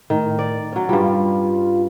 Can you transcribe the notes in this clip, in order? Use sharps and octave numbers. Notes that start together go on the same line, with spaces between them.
A2 D#3
D5
F#3 C#4
G2 G3 F4